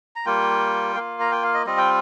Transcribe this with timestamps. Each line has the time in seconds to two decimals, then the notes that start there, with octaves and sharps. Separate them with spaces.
0.16 A#5
0.26 G3 A#3 F4 G5
0.96 A#3 F4 F5
1.20 A#5
1.31 G5
1.43 F5
1.54 D#5
1.65 G3 C4 F4 D#5
1.78 G5